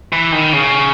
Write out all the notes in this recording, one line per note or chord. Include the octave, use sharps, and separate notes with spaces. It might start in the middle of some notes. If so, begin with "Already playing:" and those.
E3
D#3
C#3